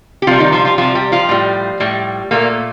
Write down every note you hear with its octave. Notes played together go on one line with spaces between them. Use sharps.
G4
C3 F3 G3 F4
D#3 D#4
F3 F4
F3 F4
C3 F3 G3 F4
G3 G4
F3 F4
A2 G3
A2 G3
A#2 A3 A#3